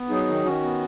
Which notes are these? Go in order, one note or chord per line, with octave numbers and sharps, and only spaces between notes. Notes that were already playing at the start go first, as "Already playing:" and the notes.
Already playing: B3
F#3 D#4 G#4
D#3
D#3 C#4 F#4
B3